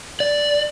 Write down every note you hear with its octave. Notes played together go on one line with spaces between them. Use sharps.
D5